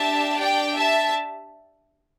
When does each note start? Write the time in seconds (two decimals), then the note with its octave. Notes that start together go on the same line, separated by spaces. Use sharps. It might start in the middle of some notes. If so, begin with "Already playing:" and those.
Already playing: D4 G4 E5 A5
0.36 D5 G5
0.76 E5 A5